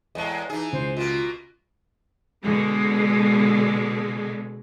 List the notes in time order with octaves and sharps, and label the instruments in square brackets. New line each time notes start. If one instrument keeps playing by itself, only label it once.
[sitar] E2 A2 G#3 [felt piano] D#5 A5
[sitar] E3 G#4 [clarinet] D#4
[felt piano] C#2 [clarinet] C5
[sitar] B2 A#3 [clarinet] F4
[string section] B2 D3 G#3